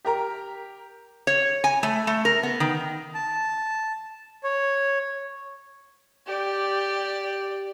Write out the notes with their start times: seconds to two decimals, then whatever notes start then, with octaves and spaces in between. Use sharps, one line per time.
0.05 G4 A#4 A#5
1.27 C#5
1.64 G#5
1.83 A3
2.07 A3
2.25 A#4
2.43 B3
2.60 D#3
3.15 A5
4.44 C#5
6.27 G4 D5